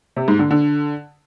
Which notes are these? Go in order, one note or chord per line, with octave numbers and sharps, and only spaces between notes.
C3
G#2
D3
D3